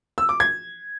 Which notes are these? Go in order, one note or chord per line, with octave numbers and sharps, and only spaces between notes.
E6
D6
G#6